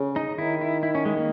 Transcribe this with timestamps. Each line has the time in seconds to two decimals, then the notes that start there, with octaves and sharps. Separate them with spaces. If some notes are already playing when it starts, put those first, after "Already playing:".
Already playing: C#3
0.16 D#4
0.38 D#3 E4
0.61 E4
0.83 E4
0.95 C#4
1.05 G#3
1.17 A#3